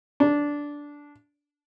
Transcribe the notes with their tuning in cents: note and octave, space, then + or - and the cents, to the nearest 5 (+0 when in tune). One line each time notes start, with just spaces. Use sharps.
D4 -10